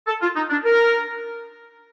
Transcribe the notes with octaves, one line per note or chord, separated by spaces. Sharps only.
A4
F4
D#4
D4
A#4